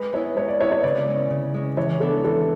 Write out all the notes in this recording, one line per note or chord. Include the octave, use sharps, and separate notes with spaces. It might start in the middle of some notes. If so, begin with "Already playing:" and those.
Already playing: G#3 B4
B3 E4 G#4 C#5
G#3 C#5
D5
B3 E4 G#4 C#5
C#5
C#3 D5
G#3 C#4
C#3
G#3 C#4
E3 C#5
B3 D4 A4
E3 A4